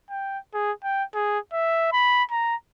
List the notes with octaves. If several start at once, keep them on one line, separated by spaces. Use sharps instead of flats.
G5
G#4
G5
G#4
E5
B5
A#5